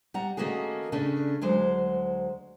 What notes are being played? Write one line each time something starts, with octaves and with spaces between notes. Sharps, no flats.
G3 F#5 A#5
D#3 A3 A#3 C#4 F#4 G#4
C#3 A3 C#4 D4
D2 F#3 G#3 C5